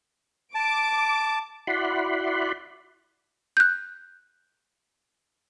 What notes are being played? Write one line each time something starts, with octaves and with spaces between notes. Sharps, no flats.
A5 D6 D7
E4 F#4 D5 F#5 B5 C6
F#6 G6